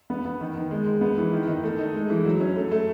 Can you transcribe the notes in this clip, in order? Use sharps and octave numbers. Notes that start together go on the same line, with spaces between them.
B3
B3
D#3
D#3
G#3
G#3
B3
E3
D#3
D#3
A3
D#4
G#3
E3
F#3
C#4
A3
A3